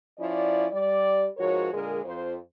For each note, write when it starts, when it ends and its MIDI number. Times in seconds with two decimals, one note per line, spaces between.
0.18 0.65 53
0.18 0.65 61
0.18 0.65 64
0.18 0.65 74
0.72 1.27 55
0.72 1.27 74
1.37 1.71 44
1.37 1.71 53
1.37 1.71 66
1.37 1.71 70
1.37 1.71 73
1.73 1.99 46
1.73 1.99 50
1.73 1.99 56
1.73 1.99 68
1.73 1.99 70
2.04 2.35 41
2.04 2.35 72